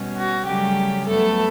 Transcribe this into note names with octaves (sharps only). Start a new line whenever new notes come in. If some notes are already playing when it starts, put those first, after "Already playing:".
Already playing: B2 G3 C#4
F#4
C#3 F#3 G3 A3 C#4 G4
G2 F#3 A3 B3 A4